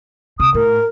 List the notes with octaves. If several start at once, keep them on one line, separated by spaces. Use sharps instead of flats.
C3 D#6
A2 A#4